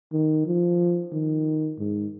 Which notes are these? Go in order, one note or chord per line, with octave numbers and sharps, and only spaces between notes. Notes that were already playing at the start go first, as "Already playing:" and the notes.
D#3
F3
D#3
G#2